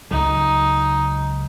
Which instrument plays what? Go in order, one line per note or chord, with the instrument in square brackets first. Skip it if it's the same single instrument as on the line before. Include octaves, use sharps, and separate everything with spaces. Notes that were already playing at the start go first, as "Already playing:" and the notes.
[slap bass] C#2 F#3 [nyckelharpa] D#4